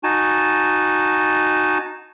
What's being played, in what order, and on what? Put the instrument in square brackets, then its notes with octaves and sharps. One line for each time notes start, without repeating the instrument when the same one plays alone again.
[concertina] D#4 F#4 G#5 A5